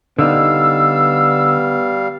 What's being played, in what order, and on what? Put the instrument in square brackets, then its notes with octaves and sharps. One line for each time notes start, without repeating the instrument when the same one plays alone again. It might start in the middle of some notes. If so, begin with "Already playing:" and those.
[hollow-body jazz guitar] D3 D#4 [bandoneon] G3 F5 [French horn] B3 [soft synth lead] E6